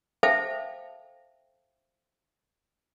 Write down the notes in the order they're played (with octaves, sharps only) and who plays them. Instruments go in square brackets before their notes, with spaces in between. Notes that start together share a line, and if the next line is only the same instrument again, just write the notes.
[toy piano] A4 C5 E5 F5 G5 A5